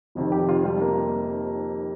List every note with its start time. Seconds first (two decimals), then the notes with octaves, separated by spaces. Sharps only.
0.15 F1 F2 C3 D#3
0.32 G4
0.49 F4
0.65 G3
0.81 A#3